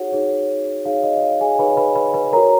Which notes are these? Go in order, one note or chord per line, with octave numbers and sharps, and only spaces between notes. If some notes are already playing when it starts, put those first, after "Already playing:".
Already playing: D#4 F#4 G#4 C#5 F#5
D#4 G#4 C#5
D#4 G#4 C#5 F5
D#5
D#5
F5
G#4 G#5
D#4 G#4 B4 C#5 B5
B4 B5
B4 B5
B4 B5
F#4 A#4 C#5 A#5